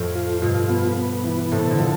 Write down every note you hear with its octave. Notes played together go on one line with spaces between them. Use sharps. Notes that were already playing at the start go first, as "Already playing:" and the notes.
Already playing: F2 A2
F4
G2 B2 F4
B3
B3
E3
A2 C3 A4
B2 D3
F3